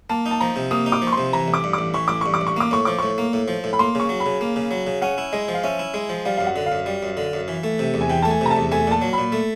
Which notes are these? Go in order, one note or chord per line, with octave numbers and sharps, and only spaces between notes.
A#3 A5
D#4
A5
F3 A#5
C3
A#3 D#6
D#4
D6
F3
C#6
C6
C3
E3 A#5
A1
D6
G2
D6
A1
E3 C#6
A1 D6
G2 C#6
D6
A1
C#6
A#3 D6
A2 C#6
F3 D6
A2 C#6
A#3
A2
F3
A2
B5
A#3 C6
C#3 C#6
F#3
B5
C#3
A#3
C#3
F#3
C#3
C#4 F#5
E4
G#3 D#5
F3
F5
C#4 E5
E4
G#3
F3
G3 F5
F#2 F5
F#5
D3
F5
F#2
G3
F#2
D3
F#2
E3
A3
C3
E2
G#5
E3 G5
A5
A3 G#5
C3 A#5
A5
E2
A3 G#5
A#2 A5
F#3
B5
A#2
A3